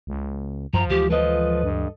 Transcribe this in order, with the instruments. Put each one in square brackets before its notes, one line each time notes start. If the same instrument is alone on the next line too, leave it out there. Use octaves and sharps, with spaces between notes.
[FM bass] C#2
[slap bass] F#2 [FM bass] F3 [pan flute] A#5
[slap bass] D2 E3 G#3 [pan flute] G4
[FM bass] F3 [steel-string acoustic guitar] A4 D#5 [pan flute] B4
[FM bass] G2